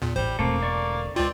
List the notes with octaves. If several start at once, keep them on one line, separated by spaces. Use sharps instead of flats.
E2 A#2
A1 G3 C5
E1 A3 A#3 C4
D3 D5 C#6
C#2 C4 F4 D5